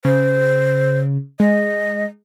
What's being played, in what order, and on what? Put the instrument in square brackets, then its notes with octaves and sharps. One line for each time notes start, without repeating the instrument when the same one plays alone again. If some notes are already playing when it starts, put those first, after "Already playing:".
[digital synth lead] C#3 [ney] C5
[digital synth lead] G#3 [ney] D#5